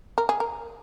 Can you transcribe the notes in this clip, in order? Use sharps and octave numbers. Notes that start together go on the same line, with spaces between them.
A#4
G#4
A#4